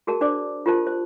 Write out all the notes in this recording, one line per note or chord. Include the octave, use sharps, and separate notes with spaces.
F#4 G#4 A#4 A5
D4 C5 D5 D6
F4 G4 A#4 C5 A5
C5